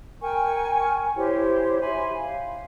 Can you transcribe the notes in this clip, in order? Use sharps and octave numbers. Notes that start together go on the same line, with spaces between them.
A#4 G5 G#5 C#6
E4 G4 C5 C#5
E5 G#5 B5 C6
F5